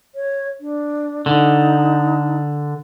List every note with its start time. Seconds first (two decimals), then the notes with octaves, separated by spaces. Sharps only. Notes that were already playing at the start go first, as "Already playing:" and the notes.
0.15 C#5
0.61 D4
1.26 D3 D#4